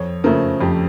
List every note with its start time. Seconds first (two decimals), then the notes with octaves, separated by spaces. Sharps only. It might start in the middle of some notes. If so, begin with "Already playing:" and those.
Already playing: F2 C#5
0.24 C#3 F3 A3 A#4
0.61 F2 G4